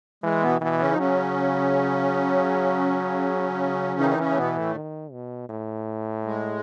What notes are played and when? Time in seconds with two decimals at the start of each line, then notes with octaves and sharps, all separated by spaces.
0.24 E3 G#3
0.42 B2 B3
0.61 B2 E3 B3
0.80 C#3 C#4
0.91 D#4
0.98 C#3 F#3 C#4
4.00 D#3 E3 D#4
4.10 D#4
4.18 C#3 C#4
4.29 A3
4.37 B2 B3
4.56 A2 A3
4.75 D#3
5.12 B2
5.49 A2
6.25 G#3